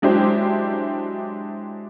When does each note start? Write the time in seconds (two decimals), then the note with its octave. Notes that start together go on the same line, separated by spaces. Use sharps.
0.02 F#3 G#3 D4 E4 G4 C5